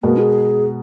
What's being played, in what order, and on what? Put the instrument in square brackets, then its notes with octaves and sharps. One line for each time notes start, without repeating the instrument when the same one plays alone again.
[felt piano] B2 G#3 B3 F#4 A#4 [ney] A#3
[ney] G#4